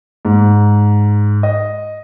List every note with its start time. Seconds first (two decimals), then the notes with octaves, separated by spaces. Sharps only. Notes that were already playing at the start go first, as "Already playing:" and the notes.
0.25 G#2
1.43 D#5